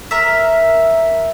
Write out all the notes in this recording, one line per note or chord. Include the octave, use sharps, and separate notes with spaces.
A#4 E5